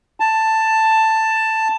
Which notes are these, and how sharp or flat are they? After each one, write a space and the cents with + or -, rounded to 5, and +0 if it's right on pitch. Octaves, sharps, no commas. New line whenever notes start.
A5 +10